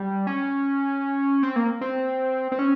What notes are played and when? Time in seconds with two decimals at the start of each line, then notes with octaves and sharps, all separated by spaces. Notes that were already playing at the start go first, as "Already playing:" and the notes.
Already playing: G3
0.27 C#4
1.43 C4
1.56 A#3
1.81 C4
2.52 C4
2.59 C#4